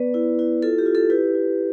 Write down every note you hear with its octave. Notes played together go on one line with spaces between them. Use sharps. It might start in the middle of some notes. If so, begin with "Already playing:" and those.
Already playing: B3 B4 D5
E4
E4
F4 A4
G4
F4
A4
E4 G4 B4
E4